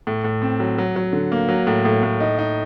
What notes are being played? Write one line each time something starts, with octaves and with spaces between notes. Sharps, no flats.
A2
A2
C4
F#3
F#3
F#3
D3
A#3
F#3
A2
A2
A2
D#4
D#4